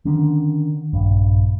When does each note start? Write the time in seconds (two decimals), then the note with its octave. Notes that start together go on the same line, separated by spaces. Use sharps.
0.05 D3 D#3 C#4 D4
0.93 A#1 G2